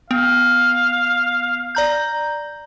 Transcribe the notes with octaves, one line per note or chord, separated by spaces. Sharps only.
B3 F5
D5 A#5 G6